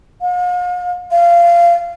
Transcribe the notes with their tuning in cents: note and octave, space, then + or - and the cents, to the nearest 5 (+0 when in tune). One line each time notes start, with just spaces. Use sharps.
F5 +45
F5 -20